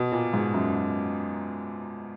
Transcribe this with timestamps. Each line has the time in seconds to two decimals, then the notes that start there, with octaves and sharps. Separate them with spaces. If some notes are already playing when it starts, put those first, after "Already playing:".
Already playing: B2
0.12 A#2
0.33 G#2
0.54 F#2